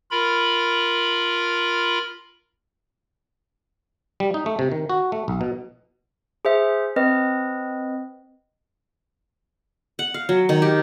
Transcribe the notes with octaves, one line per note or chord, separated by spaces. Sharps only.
F4 A#4 B5
G3
D#4
A3
C3
D#3
F#4
A3
B1
B2
G#4 C5 E5
C4 B4 D#5
F#5
F5
F#3
D#3
G4